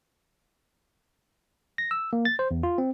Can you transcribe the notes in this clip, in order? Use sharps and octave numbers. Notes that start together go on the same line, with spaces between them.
A#6
E6
A#3
A6
C5
E2
F4
C4